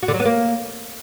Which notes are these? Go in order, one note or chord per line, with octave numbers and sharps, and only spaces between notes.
F#4
D3
F#3
B3
A#3